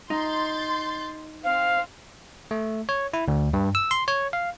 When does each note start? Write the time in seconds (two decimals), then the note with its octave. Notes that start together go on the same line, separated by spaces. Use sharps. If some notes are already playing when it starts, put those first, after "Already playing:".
0.10 D#4 C6 G6 A6
1.44 C4 F5
2.51 A3
2.89 C#5
3.13 E4
3.28 D2
3.53 G2
3.75 E6
3.91 C6
4.08 C#5
4.33 F5